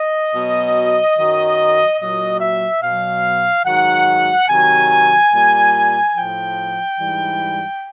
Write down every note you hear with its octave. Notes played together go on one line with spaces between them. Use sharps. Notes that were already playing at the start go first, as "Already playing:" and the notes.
Already playing: D#5
B2 F#3
F#2 D#3 F#3
A#2 F#3 D#5
E5
B2 F#3 F5
G#2 D#3 F#3 F#5
C3 D#3 F#3 G#5
A#2 G3
A2 F3 G5
G#2 E3 G3